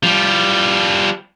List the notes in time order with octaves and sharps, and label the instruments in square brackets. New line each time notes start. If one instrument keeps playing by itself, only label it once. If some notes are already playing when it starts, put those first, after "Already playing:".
[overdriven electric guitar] F3 G3